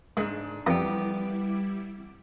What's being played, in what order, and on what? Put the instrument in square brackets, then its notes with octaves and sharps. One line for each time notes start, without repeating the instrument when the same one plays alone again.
[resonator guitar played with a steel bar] G#2 D4 [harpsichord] G#3
[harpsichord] F2 D4 A#5 [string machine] G3 E4 D6 [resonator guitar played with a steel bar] B3 G4